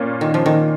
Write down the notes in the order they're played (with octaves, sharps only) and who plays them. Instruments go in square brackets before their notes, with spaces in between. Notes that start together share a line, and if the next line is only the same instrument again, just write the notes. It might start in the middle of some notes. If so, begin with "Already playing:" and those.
Already playing: [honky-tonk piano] A#2 A#3 C#4 F4
[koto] D#3
F3
D#3